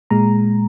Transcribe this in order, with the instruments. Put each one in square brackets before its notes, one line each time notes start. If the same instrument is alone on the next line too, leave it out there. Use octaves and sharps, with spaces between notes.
[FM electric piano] A#2 G#3 A#5